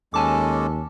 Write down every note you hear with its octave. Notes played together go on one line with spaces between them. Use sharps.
D#2 G#3 C#4 A4 G#5 A5 D6